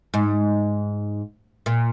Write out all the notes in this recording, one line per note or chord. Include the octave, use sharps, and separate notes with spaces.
G#2
A#2